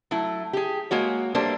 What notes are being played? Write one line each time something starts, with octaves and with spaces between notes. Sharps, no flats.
F#3 A3 E4
G4 G#4
G#3 A#3 F#4 C#5
G3 A3 A#3 D4 A4 C5